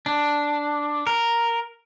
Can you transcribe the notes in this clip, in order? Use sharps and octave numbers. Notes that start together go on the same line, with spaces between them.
D4
A#4